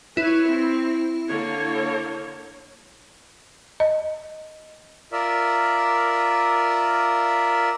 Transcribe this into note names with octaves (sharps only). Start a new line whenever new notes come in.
E4 B4 C#5
C4
D3 A#3 C#5
D#5
F4 A#4 D5 E5